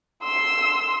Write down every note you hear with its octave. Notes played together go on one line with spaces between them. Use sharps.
C6 E6